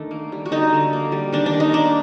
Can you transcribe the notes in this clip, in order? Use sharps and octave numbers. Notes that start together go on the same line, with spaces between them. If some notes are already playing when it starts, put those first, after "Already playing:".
Already playing: D#3 A3 D4
A#3
G3
F#4
D3 D#4
D3
A#3
G3
D#3 D4
D4
D#3
D#4
A#3 D4